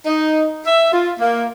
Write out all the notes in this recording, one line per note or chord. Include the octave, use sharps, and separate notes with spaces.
D#4
E5
F4
A#3